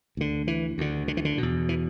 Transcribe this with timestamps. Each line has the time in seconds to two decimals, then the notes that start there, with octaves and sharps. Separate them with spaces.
0.17 D2 D3
0.48 E3
0.78 D2 D3
1.08 D3
1.17 E3
1.25 D3
1.38 E2 B2
1.69 E3